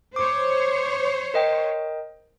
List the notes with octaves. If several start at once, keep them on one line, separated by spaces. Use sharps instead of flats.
C5 C#5 D6
A#4 D#5 G5